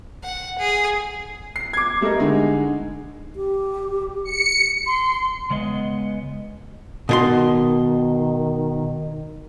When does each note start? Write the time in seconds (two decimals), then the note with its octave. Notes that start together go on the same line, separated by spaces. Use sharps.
0.23 F#5
0.58 G#4
1.56 C7
1.73 D6 G#6
2.01 G3 A3 A4 A#4 D#5
2.19 D3 G#3 D#4
3.36 G4
4.24 C#7
4.86 C6
5.50 C#3 G#3 B3 D#5
7.09 B2 D#3 C#5 C6